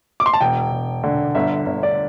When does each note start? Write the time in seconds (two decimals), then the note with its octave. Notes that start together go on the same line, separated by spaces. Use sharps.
0.20 D6
0.26 C6
0.33 A5
0.41 E1 G5
0.72 E1
1.04 D3
1.35 G1 E5
1.66 G1
1.83 D5